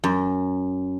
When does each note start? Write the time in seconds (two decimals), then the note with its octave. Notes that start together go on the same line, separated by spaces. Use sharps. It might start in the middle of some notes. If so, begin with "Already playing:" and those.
0.04 F#2